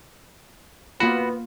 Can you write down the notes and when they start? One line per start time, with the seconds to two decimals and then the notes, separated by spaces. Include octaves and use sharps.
1.00 A#3 B3 F4 F#4 B5